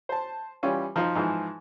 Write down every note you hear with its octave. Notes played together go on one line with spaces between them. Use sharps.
C5 A5
E3 G3 C#4 F4
F3 D#4 F4
G#2 E3 F3